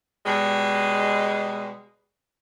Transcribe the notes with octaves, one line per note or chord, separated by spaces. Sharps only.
B2 G3 G#3